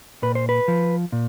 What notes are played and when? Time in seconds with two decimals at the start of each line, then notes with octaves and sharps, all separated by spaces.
0.22 A#2 B4
0.35 C5
0.49 B4
0.68 F3
1.12 A#2